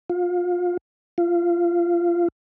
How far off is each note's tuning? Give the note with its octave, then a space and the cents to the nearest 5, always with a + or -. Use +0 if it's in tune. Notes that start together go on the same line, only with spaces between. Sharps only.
F4 +25
F4 -20